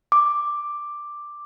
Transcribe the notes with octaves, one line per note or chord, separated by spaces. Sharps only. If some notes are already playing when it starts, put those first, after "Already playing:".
D6